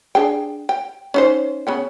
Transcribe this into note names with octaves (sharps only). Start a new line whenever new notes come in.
D4 G#4 G5
G5
C#4 D#4 C5
C#3 B3 G5